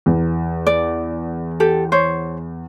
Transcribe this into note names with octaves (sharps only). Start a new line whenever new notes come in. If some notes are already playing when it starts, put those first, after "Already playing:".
E2
D5
G4 A4
C5 C#5